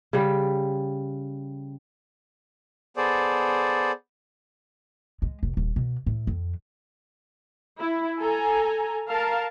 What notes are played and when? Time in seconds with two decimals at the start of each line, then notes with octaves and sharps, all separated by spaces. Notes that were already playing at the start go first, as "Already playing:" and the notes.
0.13 C#3 G3
2.97 B3 G#4 A4 C5 D5
5.22 G#3
5.43 F1
5.57 D#1
5.76 B2
6.07 A2
6.27 F2
7.79 E4
8.19 A4 G#5 A#5
9.09 A#4 F5 A5